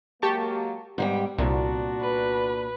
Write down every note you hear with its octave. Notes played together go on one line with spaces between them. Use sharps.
F#3 G#3 A#3 G4 A5 C#6
G#2 G3 B3 G5
C2 A#2 B3 D4 F#4
B4